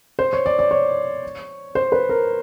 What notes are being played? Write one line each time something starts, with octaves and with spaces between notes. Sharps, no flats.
C5
C#5
D5
D5
C#5
C5
B4
A#4